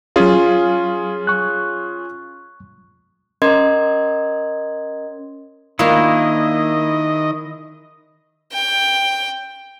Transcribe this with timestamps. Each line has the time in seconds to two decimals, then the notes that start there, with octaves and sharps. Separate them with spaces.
0.16 F#3 C#4 F4 G#4 F5
1.27 C#6 F#6
3.42 C#4 A#4 D#5 C6 G#6
5.79 D#3 A#3 D4 E4 F4 D#5
8.53 G5